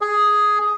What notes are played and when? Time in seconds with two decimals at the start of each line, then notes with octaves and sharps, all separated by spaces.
0.01 G#4